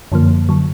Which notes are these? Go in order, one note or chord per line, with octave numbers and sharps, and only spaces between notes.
F#2 D3 F3 A#3
D3 F#3